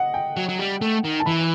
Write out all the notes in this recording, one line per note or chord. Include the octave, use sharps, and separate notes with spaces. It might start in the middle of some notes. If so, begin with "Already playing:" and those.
Already playing: D#5 F#5
G5
F#3
F#3
G3
A3
D#3
A5
E3 B5